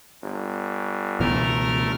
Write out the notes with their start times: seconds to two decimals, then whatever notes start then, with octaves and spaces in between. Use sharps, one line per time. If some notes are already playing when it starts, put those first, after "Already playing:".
0.23 G1
1.20 C#2 B2 E3 A3 A#4 F6